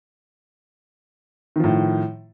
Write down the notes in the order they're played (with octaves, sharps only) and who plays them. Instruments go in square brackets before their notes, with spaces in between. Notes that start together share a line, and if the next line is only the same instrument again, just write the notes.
[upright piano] D#3
F3
A2